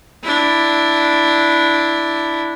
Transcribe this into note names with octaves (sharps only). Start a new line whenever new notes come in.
D4 E4